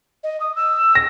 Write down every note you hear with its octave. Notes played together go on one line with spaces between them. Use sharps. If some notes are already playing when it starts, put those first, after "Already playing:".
D#5
D#6
E6
A#6